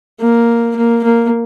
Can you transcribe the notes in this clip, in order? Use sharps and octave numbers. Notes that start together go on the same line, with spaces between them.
A#3
A#3
A#3